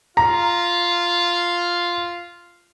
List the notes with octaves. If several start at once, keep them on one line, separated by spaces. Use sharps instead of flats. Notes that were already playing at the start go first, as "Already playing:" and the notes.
F4 A#5